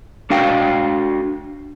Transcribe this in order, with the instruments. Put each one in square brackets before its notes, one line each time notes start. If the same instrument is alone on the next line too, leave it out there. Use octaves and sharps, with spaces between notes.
[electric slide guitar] D4 F#4 F5 G5